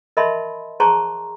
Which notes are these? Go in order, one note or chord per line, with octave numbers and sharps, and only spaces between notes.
A#4 D#5 E5 A5 B5 C6
G#4 C5 A5 A#5 C6 C#6